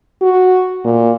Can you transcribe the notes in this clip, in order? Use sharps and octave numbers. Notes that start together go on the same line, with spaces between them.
F#4
A#2